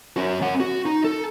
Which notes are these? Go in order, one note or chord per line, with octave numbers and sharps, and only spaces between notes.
C#4 F#4
C#4 F#5
F#4
D#4
A4